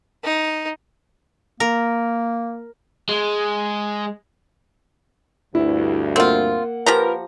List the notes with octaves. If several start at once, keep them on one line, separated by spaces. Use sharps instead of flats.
D#4
A#3 A#4
G#3
D2 G2 E4
A#3 C4 F4 F#5
F3 F4 G4 A#4 B4 A#5